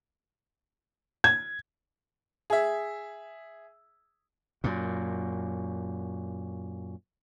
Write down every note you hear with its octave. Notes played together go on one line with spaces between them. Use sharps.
G#6
G#4 E5
F#2 A#2